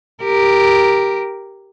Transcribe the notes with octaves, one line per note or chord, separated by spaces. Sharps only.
G4 A#4